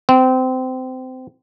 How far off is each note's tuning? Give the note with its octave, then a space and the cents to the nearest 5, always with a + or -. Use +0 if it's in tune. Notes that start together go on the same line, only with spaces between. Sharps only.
C4 -25